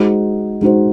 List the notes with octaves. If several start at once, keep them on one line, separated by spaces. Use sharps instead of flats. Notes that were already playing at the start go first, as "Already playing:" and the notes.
Already playing: G#3 D#4 F#4 C5
G#3 D#4 F#4 C5